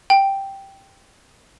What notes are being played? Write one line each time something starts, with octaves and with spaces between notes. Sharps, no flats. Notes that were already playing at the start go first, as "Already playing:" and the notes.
G5